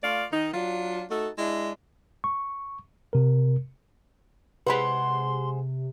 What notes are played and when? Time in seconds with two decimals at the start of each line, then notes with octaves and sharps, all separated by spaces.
0.03 A3 F4 D5 F5
0.31 D#3 D#4
0.54 F#3 D4 F4
1.10 A3 D#4 F#4 A4
1.38 G#3 D4 E4
2.24 C#6
3.13 C3 A#4
4.67 C3 G#3 B4 C5 F#5 B5 C6